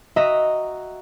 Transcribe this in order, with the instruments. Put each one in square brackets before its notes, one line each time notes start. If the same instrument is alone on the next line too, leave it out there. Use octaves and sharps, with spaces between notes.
[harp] F#4 D#5 E5 A#5